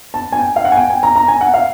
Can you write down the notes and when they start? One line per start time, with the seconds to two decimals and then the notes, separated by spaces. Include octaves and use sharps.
0.14 A5
0.32 G#5
0.39 G5
0.56 F5
0.65 F#5
0.72 G#5
0.77 G5
0.90 G#5
1.03 A#5
1.16 A#5
1.28 G#5
1.41 F#5
1.54 F5